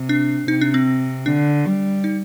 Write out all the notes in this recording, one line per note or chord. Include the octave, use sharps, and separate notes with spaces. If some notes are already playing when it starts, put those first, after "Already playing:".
Already playing: C3
D4
C3 D#4
D4
C4
D3 D4
G3
D#4